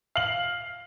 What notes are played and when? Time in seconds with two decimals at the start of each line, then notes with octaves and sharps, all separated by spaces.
0.16 F5 F#7